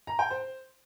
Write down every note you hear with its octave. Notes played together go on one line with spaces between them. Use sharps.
A#5
G5
C5